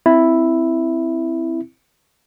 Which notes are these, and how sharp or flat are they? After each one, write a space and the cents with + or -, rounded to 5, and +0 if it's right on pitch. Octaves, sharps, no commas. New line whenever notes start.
C4 -5 E4 +0